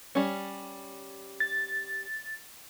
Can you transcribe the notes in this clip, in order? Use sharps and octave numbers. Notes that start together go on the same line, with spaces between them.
G3 C#4
A6